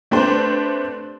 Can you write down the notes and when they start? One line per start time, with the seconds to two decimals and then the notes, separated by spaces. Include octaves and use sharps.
0.11 A3 C4 D4 G4 B4 C5